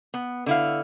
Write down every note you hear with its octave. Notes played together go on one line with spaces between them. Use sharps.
B3
D3 E4 F5